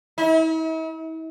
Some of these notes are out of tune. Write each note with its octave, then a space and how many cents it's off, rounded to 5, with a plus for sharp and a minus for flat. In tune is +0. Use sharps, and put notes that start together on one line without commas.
E4 -45